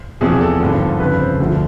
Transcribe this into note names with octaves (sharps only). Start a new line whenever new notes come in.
E2 C3 F3 G#4
A4
G#1 G2 D3 F3
G1 F2 C#3 F3 B4
C5
D2 D3 F3